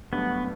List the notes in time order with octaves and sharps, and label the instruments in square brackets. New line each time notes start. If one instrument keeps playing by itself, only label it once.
[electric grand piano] G2 F#3 A3 D4 [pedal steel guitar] B3